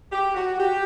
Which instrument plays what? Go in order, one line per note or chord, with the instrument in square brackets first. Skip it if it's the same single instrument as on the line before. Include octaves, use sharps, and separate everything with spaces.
[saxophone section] G4
F#4
G4